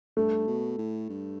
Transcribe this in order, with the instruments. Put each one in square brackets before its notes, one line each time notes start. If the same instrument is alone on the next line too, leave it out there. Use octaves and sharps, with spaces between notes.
[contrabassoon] G2 [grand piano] A3
[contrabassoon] B2
A2
G2